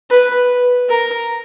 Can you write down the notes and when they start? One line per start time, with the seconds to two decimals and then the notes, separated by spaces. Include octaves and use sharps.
0.10 B4
0.89 A#4